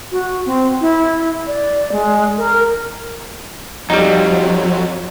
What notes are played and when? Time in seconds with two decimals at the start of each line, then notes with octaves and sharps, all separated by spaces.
0.12 F#4
0.46 C4
0.81 E4
1.47 D5
1.92 G#3
2.38 A#4
3.90 F2 F#3 G3 D#4